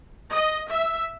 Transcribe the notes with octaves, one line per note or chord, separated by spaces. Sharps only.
D#5
E5